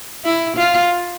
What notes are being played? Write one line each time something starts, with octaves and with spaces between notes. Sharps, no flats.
E4
F4